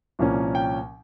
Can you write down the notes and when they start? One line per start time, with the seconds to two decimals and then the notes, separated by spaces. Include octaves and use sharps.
0.19 C2 A#2 F3 A#3 C#4
0.55 G5